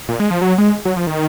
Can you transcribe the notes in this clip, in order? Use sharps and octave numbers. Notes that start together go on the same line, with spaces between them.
A#2
G#3
F3
F#3
G#3
F#3
F3
D#3